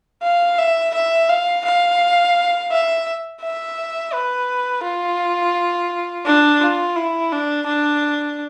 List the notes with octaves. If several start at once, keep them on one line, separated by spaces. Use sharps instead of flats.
F5
E5
E5
F5
F5
E5
E5
B4
F4
D4
F4
E4
D4
D4